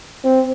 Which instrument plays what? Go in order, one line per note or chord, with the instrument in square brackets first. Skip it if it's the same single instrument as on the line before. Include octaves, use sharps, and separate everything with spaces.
[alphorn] C4